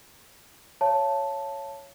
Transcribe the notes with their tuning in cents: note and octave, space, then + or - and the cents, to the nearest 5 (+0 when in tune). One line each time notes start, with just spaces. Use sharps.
C#5 +0 F5 -45 A5 +0